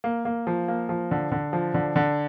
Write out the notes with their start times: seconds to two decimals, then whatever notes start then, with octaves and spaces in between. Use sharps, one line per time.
0.04 A#3
0.25 A#3
0.47 F3
0.68 A#3
0.89 F3
1.11 D3
1.32 D3
1.53 F3
1.74 D3
1.96 D3